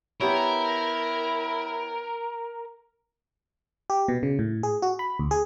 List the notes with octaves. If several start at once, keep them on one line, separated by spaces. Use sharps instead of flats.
B3 E4 G4 A#4 C#5
G4
B2
C#3
A2
G#4
F#4
B5
D2
G#4